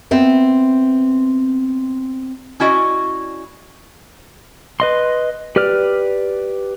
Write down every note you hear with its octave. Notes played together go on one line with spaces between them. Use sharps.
B3 C4 E5
C#4 E4 F#4 D5 D#5
B4 D#5 C6
G4 B4 D5 F6